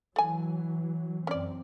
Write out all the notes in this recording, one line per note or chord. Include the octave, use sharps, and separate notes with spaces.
E3 F#3 A3 G#5
F#2 C4 C#4 D5